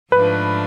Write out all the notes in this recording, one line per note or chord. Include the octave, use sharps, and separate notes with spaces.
G#2 F3 A3 D4 B4